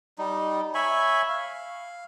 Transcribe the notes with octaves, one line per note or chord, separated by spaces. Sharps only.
G3 D#4
C#5 E5 G#5 B5
F5